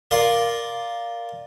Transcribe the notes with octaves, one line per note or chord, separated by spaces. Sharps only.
F4 A#4 D5